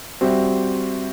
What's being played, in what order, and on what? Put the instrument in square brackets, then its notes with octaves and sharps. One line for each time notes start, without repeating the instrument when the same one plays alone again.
[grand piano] G3 C4 F#4 C5 E5